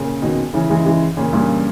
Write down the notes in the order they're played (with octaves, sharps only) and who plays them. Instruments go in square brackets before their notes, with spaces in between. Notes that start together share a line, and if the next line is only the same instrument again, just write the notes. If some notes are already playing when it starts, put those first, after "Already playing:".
Already playing: [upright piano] A#2 C#3
B2 D#3
C#3 E3
E3 G#3
E3 G#3
A#2 C#3
G2 A#2